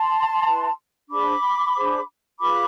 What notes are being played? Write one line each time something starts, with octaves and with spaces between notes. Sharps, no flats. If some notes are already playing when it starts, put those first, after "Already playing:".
Already playing: A5 C6
E4 B4
D4 G#4 C5 B5 D6
D4 G#4 C5
F4 G#4 B4 B5 D6